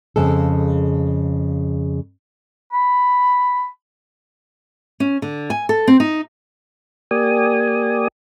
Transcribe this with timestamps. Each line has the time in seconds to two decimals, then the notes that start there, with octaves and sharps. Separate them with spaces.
0.16 F2 C#3 G#3 A4
2.73 B5
5.00 C#4
5.22 D3
5.50 G#5
5.69 A4
5.87 C4
6.00 D#4
7.11 A#3 G4 D5 G#5 D#6